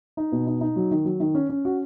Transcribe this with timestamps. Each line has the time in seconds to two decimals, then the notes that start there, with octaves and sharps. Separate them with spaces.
0.17 D#4
0.32 B2
0.47 D#4
0.61 D#4
0.76 F#3
0.91 D#3
1.05 F#3
1.20 D#3
1.35 C#4
1.49 C#4
1.65 F#4